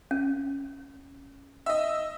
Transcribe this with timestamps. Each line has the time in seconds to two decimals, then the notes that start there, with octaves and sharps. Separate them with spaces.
0.11 C#4
1.66 D#5 E5